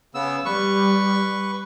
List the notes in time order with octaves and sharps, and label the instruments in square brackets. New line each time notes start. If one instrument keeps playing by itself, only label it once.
[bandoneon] C#3 B3 E6
[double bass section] G3 [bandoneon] B4 C#6